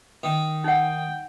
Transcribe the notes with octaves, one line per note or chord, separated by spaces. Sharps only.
D#3
D#4 F#5 G5